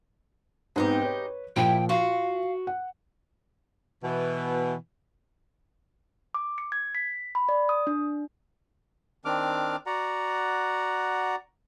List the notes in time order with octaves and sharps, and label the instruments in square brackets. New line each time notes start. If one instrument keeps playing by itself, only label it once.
[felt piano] G#2 B3 C4 [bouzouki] G#3 D#4 G4
[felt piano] B4 C#5
[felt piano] A#2 F3 [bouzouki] E4 G4 [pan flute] G5
[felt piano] F4 [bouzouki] F#4 [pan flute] F5
[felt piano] F#5
[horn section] B2 E3
[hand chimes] D6
C#7
G#6
B6
B5
D5
D#6
D4
[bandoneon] D#3 C4 D4 D6 F6
F#4 D5 F#5 A#5